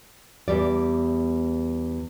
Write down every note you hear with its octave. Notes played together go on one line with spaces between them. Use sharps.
E2 G3 D5